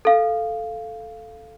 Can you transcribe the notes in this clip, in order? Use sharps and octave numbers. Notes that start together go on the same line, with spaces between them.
A4 F5